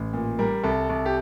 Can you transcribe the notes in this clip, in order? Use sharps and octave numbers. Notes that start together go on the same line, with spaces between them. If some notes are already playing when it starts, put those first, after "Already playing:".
Already playing: A1
A#2
G3 A#4
C2 A4
C2
G4